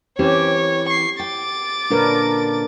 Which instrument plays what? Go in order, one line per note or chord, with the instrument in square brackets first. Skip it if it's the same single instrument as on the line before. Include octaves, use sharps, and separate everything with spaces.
[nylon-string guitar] E3 C4 C#4 [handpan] G4 [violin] C#5
[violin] C#6 C7
[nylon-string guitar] G5 [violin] D6 A6
[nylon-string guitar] A#2 D3 C#4 [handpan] D4 A#4 B4